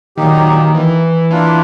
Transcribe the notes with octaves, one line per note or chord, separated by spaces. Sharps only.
A#2 D#3 F#3 A#3 D#4 G4
E3
E3 A#3 D4 F4